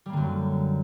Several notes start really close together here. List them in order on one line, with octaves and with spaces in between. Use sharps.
G3 A#3 D3 F#2